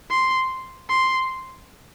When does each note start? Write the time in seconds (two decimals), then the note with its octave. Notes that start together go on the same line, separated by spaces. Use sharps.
0.10 C6
0.89 C6